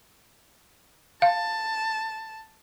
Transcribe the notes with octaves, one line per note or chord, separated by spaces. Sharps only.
F5 A5